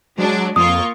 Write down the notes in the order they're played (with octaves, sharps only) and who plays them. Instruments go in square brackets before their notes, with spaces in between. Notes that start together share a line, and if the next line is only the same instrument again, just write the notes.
[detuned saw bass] F#3 [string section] G#3 D4
[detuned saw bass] F2 [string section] A#3 F4 C#6 [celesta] D#6